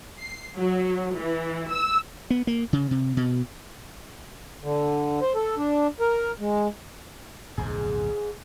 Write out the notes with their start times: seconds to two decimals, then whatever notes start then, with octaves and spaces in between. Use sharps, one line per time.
0.19 C7
0.58 F#3
1.17 E3
1.71 E6
2.30 B3
2.47 A#3
2.73 C#3
2.91 C3
3.17 B2
4.63 D3
5.21 C5
5.35 A4
5.57 D4
6.00 A#4
6.39 G#3
7.58 D1 B1 F2 G#2 G#4